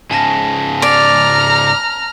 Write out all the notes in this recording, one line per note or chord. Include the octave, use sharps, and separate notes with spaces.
G#2 C#3 G#5 A5 A#6
D5 A#5 F6